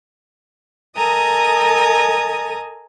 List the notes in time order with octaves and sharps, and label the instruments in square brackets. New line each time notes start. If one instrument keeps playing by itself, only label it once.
[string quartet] A4 A#4 D#5 G#5 A#5 D#6